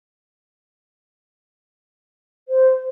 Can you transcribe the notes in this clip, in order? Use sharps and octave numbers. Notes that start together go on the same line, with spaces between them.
C5